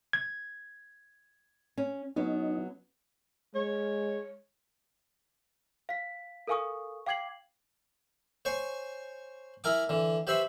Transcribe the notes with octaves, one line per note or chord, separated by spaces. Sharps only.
G#6
C#4
F#3 B3 C#4 D#4
G#3 C#5
F5 B6
A4 A#4 F5 G#5 C#6 D#6
F5 G5 D6 G#6 C7 F#7
C5 C#5 G#5 C#6
E4 A#4 G#5 D6
D3 E3
G4 B4 C5 E5 B5 C#6